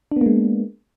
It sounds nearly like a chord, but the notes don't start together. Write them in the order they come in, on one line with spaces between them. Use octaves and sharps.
D4 B3 A#3 G#3